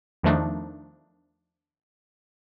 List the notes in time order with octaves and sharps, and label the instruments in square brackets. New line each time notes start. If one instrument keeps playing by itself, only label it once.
[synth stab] E2 D#3 F3 A3 D4 D#4